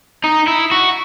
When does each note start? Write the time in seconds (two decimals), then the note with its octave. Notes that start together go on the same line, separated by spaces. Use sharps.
0.24 D#4
0.47 E4
0.71 F#4